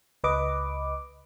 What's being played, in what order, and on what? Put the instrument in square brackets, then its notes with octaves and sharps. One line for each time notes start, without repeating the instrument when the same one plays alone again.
[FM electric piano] C#2 B4 D#5 D6